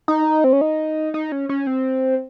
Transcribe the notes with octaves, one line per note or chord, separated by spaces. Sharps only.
D#4
C4
C#4
D#4
D#4
C#4
C#4
C4